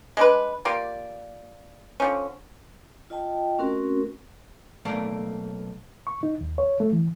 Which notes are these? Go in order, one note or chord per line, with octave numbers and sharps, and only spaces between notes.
G#3 D4 B4
A#3 F4 G4 D5
D3 F3 C#4
F4 D#5 G5 A5
A3 C4 C#4 F#4 A#4
B1 A3 A#3 D5
C#6
D#4
D#2
C#5
A3
E3